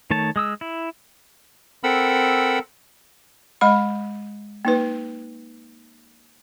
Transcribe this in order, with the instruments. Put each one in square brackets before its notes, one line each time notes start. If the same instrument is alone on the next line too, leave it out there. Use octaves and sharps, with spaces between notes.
[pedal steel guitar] D#3 A3 C#5 A5
G#3 D#6 E6
E4
[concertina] C4 A4 A#4 F#5 B5 E6
[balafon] G#3 D#5 B5
A#3 D#4 B4